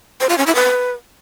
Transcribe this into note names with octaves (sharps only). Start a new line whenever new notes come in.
C5
F4
C#4
E4
B4